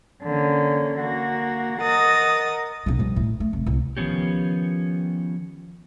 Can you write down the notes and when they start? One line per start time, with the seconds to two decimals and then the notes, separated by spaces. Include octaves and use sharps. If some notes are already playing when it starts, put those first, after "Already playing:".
0.24 D3 A#3 C#4
1.01 A#3 F#4
1.82 A#4 D#5 F#5 D#6 A6
2.86 B1 D3
2.99 F3 G3
3.16 A2
3.40 A3
3.53 F1
3.66 C2
3.97 D#3 F3 B3 C#4 G4